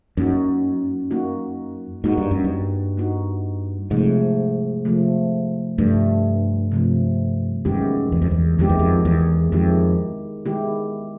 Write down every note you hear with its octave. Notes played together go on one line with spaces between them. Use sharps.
F#2 A#3 D#4 F#4
A#3 D#4 F#4
G#2 A#3 D#4 F#4
G2
F#2
G2
A#3 D#4 F#4
G#2 C3 F3 A3
C3 F3 A3
G2 C3 F3 A3
C3 F3 A3
F#2 D#3 G#3 B3 E4 G4
E2
F2
E2
F2 D#3 G#3 B3 E4 G4
E2
F2
E2
F2 D#3 G#3 B3 E4 G4
D#3 G#3 B3 E4 G4